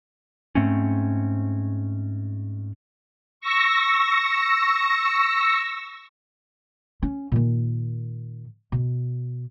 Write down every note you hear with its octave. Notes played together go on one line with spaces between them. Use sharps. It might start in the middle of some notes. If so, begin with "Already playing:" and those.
G#2 A3 C4 C#4
C#6 E6 A#6
C#4
A#2 D#3
B2